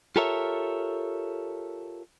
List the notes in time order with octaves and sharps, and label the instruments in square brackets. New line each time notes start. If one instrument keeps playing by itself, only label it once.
[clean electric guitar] F4 G4 A4 A#4 C#5 E5